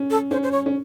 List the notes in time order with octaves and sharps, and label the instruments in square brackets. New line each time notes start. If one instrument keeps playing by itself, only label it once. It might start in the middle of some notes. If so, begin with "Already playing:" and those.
Already playing: [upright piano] C#4
[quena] A4
[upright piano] C#4 [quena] C5
[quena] C5
C#5
[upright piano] C#4